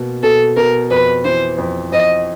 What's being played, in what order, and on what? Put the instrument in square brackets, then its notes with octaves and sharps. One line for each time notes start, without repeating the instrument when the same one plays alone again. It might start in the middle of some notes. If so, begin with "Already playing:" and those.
Already playing: [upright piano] B2 A#3
[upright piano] B2 [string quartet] A4
[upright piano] B2 [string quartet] A#4
[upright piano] F2 [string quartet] B4
[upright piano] E3 [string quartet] C5
[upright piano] F2
[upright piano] F2 [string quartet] D#5